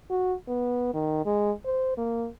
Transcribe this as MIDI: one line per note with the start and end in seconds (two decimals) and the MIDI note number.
0.10 0.34 66
0.48 0.91 59
0.94 1.22 51
1.25 1.52 56
1.65 1.95 72
1.97 2.28 58